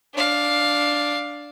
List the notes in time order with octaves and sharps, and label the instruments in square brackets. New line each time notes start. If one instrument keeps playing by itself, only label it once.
[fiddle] D4 F5